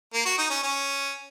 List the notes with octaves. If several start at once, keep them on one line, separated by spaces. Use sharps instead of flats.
A#3
F#4
D#4
C#4
C#4